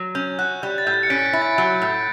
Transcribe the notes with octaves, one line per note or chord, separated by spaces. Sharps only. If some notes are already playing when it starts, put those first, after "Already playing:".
Already playing: F#3
C#4 G6
F#4 F#6
G3 G6
A6
A2 G6
A6
C#7
C#4 B6 D7
C#7
B6
E4
A6
F#3
A2